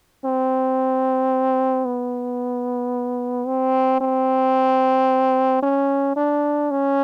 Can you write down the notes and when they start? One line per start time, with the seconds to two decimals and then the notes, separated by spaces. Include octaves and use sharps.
0.25 C4
1.85 B3
3.47 C4
4.01 C4
5.63 C#4
6.17 D4
6.71 C#4